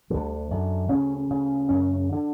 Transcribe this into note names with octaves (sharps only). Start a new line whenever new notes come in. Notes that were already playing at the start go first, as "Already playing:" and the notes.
D2 D3 G3
F#2 D3
D2 C#3 C#4
D2 C#3
F#2 C#3 C#4
D3